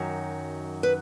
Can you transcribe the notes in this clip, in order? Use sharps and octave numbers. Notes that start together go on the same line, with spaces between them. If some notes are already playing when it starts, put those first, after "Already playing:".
Already playing: F#2 D#3 F#3
B4